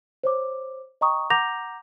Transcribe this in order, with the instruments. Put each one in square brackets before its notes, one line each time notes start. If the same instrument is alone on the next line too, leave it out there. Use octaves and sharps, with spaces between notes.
[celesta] C5 C#5 D6
D#5 G5 A#5 C#6 D#6
F#5 A#5 D6 G6 A#6 F7